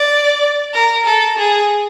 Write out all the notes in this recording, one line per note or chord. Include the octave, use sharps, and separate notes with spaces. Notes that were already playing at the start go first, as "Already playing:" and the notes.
Already playing: D5
A#4
A4
G#4